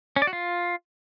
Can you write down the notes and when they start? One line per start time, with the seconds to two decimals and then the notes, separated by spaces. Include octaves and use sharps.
0.16 C#4
0.22 D5
0.27 F#4
0.33 F4